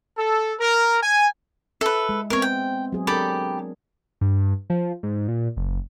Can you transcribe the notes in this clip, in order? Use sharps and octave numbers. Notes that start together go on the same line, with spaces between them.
A4
A#4
G#5
A4 B4 E5
G#3
B3 C4 A#4 C#5
G5
F#3 G#4
D4 G4 A4 A#4 B5
G2
F3
G#2
A#2
F#1